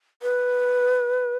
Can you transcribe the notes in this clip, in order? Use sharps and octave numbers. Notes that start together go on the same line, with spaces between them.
B4